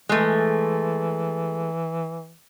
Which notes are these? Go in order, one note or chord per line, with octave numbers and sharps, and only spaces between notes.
E3 G#3 A3